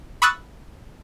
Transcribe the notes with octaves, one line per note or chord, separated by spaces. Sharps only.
B5 C#6 D#6 E6 F#6 A6